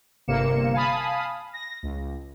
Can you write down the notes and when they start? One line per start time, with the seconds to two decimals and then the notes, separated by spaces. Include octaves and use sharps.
0.28 G1 C3 A#3 C#7 E7
0.73 F5 G#5 A5 B5 D#6
1.53 A#6
1.83 C#2